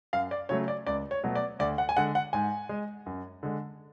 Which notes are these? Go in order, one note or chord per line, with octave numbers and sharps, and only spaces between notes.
F#2 F5
D5
C#3 F#3 A3 C#5
D5
C#2 D5
C#5
B2 F#3 A3
D5
D2 D5
F#5
G#5
D3 G#3 F#5
F#5
G#2 G#5
G#3
F#2
D3 G#3